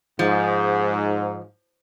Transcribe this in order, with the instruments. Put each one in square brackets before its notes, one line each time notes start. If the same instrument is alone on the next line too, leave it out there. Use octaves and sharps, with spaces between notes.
[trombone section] G#2 [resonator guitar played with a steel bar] F3